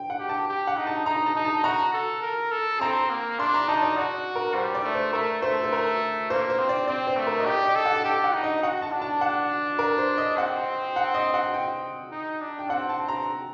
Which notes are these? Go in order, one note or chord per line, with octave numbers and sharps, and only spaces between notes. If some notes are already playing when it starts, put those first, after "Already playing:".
Already playing: G5
F#5
G4
A5
G4
F#5
D#4
A5
D#4 A#5
A5
D#4
A5
F#4 A#5
A4
A#4
A4
C4 A#5
A#3
D4 C6
A#5
D#4 A5
D5
F#4 D5
A#4
G3 C5
D5
A3
C5
A3 A#4
A3 C5
C5
A#4
A#3 C5
C5
C4
D5
C4 D5
C5
A3
A#4
D#5
G4 D5
D#5
A4
F#5
A5
G4 G5
F#5
D#4
D#5
F#4 F#5
A5
D4
A5
F#5
A#4
C5
D#5
C4 F#5
F#5
D#5
F#5
G5
D#4
D4
G5
C4 F#5
A5
A#5